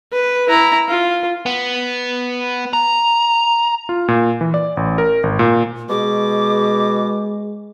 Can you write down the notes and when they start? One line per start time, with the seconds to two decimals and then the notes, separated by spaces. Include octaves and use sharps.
0.13 B4
0.49 E4 A#5
0.88 F4
1.46 B3
2.73 A#5
3.89 F4
4.08 A#2
4.41 E3
4.54 D5
4.77 A1
4.98 A#4
5.23 G#1
5.39 A#2
5.89 B2 G#3 G#4 D6